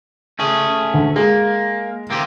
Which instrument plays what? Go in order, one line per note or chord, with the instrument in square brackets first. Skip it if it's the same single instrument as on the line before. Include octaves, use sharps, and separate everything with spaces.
[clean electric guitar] A3 C#4 G#4
[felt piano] D2
[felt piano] G#3 [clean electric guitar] A#3
[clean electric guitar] A#3 C4 G4